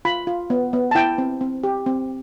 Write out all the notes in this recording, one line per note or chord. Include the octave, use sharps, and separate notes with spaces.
F4 B5
F4
B3
B3
A5
E4 G5
C4
C4
G4
C4